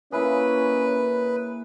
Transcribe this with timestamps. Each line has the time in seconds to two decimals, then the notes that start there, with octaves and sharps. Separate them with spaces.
0.12 A#3 C#4 E4 G#4 B4